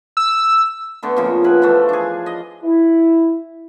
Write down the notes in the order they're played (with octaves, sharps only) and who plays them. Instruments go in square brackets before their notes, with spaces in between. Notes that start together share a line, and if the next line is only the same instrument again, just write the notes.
[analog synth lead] E6
[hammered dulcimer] D3 A3 B3
A#2 C#3 F3
E4 G#4 B4 F#5
E3 F3 A3
D4 G#4
D#5
[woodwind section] E4